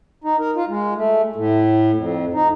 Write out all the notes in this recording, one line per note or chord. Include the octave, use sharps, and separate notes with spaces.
D#4
A#4
F4
G#3
A3
A2
F2
D#4